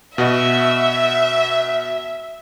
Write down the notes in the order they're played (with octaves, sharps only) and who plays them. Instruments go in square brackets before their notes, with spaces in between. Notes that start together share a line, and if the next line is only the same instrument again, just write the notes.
[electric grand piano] B2 F#4 D#5 [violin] E5